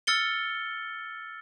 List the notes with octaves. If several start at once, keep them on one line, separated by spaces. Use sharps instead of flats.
E6 F6 A6 C#7 G7